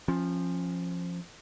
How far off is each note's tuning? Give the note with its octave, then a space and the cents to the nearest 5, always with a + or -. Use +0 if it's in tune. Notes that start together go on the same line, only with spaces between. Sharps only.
F3 +0 C#4 -30